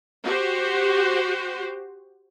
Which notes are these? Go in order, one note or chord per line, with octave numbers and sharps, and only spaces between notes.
F#4 G4 C5